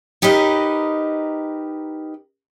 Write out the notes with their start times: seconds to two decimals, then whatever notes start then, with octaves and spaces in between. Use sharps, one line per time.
0.22 D#4 G4 A#4 B4 D#5